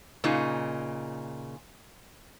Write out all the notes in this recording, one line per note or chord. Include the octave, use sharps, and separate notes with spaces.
A#2 C#3 D#4